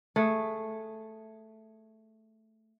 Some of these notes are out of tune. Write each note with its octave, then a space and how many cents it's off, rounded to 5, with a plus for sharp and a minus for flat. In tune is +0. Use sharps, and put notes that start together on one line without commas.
A3 +0 G#4 +0